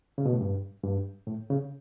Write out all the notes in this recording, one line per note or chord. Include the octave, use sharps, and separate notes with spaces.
C#3
B2
A2
G2
G2
A2
C#3